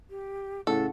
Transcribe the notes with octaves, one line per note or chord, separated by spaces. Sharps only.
G4
A2 C#3 A4 F#5